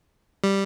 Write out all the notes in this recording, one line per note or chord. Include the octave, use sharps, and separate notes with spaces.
G3